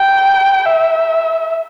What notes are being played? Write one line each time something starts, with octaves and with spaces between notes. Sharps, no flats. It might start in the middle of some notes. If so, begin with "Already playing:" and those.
Already playing: G5
E5